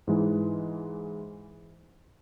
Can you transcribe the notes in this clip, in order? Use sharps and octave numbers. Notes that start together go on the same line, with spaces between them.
G#2 E3 G#3